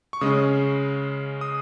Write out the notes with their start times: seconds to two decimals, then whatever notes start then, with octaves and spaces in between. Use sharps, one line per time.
0.13 C#6
0.21 C#3 G#3 C#4 D#6
1.41 D#6